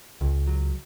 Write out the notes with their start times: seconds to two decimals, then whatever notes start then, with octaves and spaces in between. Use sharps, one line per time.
0.21 C#2
0.47 F#3